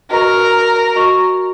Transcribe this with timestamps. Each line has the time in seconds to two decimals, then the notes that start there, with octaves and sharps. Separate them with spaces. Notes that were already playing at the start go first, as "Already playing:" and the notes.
0.10 F#4 A#4 D#5 A#5 C#6
0.95 F#4 D#5 A#5 C#6